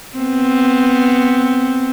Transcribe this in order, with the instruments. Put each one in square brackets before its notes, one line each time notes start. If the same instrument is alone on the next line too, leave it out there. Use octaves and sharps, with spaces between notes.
[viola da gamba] B3 C4